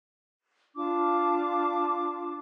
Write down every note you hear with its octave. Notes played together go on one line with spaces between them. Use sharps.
D4 F4 A5 D6